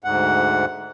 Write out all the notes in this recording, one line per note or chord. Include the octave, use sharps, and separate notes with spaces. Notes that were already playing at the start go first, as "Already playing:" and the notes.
D2 G#2 F#5